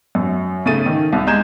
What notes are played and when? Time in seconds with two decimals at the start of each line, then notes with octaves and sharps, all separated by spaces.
0.15 F#2
0.66 C#3 A3 A6 D#7
0.86 D#3
1.13 C2
1.27 G#3 A#5 G6 G#6 E7